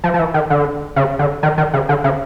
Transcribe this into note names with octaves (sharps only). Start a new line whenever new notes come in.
F3
F3
E3
D#3
D3
C#3
D3
D#3
D#3
C#3
D3
C#3